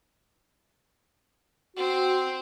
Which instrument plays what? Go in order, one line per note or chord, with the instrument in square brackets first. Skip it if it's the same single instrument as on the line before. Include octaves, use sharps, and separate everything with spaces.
[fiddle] C4 [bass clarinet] F#4